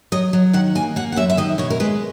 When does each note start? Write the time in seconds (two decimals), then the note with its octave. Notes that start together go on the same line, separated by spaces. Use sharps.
0.12 F#3 D#5
0.33 F#3
0.53 D#3 F#5
0.75 A#3 G#5
0.96 A#3 F#5
1.12 F#5
1.16 F#2 E5
1.30 E5
1.37 D#3 D#5
1.58 B2 C#5
1.70 A#4
1.80 G#3 B4